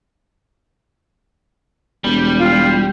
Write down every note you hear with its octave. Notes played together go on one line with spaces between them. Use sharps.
E1 G3
F4